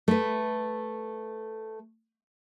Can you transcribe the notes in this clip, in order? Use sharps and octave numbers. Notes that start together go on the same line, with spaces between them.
A3 B4